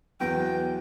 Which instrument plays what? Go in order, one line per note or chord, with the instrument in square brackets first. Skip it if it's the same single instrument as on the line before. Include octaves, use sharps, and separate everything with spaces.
[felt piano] E2 A#6 [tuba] F#3 [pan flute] B4 [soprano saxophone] G5